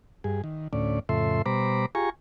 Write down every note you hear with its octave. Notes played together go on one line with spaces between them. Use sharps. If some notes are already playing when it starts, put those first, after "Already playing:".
G2 G#4
D#3
D2 A2 C#4 D5
F2 A2 C#3 A4 E5 C6
B2 G3 C5 A#5 B5 D6
F4 G4 G#4 G#5 A#5 C#6